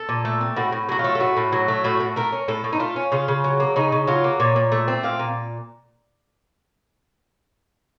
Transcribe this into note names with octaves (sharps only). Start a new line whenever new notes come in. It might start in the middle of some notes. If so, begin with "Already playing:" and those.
Already playing: A4
A#2
A3
C4
A2 F#4
A2
F#3 F#4
F4
A3
A4
A2 F#4
A2
F#3
A3
A2 F#4
A2
A3 A#4
C#4
A2 A4
A2
D#4
A3 F4
C#4
C#3 F4
C#3
F#3
A#3
C#3 D#4
C#3
F#3 F4
A#3
A#2 C#5
A#2
A3
C4
A#2 F5
A#2